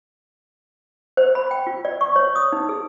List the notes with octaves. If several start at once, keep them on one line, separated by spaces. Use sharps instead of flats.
C5
B5
G5
F4
D5
C#6
C#5
D#6
D#4
G#4